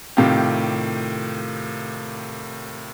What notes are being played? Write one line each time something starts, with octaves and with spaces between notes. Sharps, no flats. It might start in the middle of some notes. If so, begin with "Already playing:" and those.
A2 C3 D#3 F4 G4